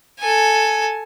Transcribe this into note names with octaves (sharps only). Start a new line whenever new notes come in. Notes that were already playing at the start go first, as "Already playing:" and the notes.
A4 G#5